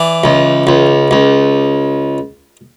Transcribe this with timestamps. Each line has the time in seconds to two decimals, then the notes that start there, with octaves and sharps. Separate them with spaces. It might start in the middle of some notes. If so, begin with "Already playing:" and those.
Already playing: E3 D5
0.24 C#2
0.67 C#2
1.11 C#2